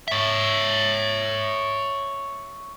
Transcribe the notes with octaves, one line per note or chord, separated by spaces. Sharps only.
C#5 E5